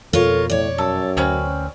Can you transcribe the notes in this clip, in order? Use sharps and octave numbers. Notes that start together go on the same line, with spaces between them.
F2 B2 F4 A4 A#4 C#5
A2 C#5 D5
F#2 A4
D2 C4 C#4 B4